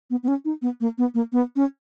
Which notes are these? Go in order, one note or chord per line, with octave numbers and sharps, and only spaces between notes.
B3
B3
C#4
D#4
B3
A#3
B3
A#3
B3
C#4